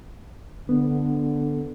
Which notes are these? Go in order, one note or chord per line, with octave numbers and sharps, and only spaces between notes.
D3 B3